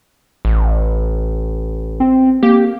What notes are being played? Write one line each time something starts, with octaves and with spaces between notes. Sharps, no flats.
A1
C4
A#3 G4